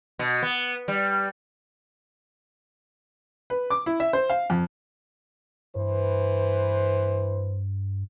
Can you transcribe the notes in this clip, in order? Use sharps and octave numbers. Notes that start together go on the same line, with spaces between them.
B2
B3
G3
B4
D6
E4
E5
C5
F5
F2
G2 E3 B4 C5